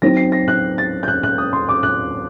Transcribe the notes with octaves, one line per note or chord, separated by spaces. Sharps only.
F#3 C4 D#4 A#6
C7
A#6
F#6
A6
G6
F#6
F#6
D#6
C6
D6
F#6